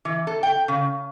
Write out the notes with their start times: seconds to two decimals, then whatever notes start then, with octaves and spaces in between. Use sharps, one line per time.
0.05 E3
0.27 A4
0.43 G5
0.68 C#3